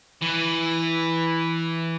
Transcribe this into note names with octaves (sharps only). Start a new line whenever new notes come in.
E3